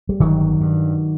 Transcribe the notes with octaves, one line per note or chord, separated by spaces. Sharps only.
G3
G1 D#3 F#3
G2